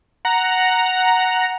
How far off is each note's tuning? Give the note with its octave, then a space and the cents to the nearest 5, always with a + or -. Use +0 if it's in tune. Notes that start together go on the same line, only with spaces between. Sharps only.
F#5 +0 A#5 +0